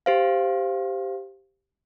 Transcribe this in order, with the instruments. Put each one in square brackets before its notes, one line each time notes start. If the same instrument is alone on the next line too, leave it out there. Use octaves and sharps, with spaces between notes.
[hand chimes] G4 C5 F5